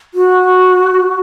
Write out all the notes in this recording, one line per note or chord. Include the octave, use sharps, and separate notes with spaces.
F#4